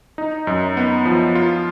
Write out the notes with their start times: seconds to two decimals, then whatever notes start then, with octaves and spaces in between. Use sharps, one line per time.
0.18 D#4
0.47 F#2
0.77 B3
1.06 F3
1.35 F4